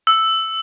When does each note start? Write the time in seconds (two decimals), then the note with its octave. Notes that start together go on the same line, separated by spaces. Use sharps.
0.07 E6